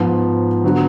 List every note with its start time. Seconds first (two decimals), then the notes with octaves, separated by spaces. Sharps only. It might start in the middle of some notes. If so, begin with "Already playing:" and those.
Already playing: G#2 F3 B3
0.64 D3 F#3 B3 F#4